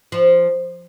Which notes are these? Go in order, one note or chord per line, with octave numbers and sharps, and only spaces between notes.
F3